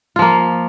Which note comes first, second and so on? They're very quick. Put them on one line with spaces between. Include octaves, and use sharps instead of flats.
F4 F3 A#3